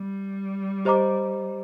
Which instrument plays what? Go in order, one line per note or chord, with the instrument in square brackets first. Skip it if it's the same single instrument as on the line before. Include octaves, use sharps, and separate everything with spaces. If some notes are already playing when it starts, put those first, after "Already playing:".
Already playing: [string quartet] G3
[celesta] G4 C5 D#5 A#5 D6